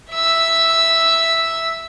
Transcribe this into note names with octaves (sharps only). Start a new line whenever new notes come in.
E5 E6